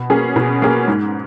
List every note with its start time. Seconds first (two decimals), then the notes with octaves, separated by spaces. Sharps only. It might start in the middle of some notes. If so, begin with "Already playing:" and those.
Already playing: B2
0.10 A#3 C#4 G#4
0.36 B2
0.62 A#3 C#4 G#4
0.88 G#2